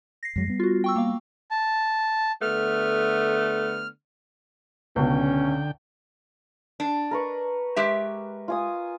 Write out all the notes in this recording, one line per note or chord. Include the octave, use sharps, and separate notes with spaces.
A#6 C7
F#2 F#3 G#3
G3 B3
F4 F#4
G5 C#6 E6
A#3 F5
A5
D3 A3 B3 F6
C#2 B2 D3 C#4 G5
D4
A#4 B4 C#6
G#3 G4 E5
F4 G#5 D#6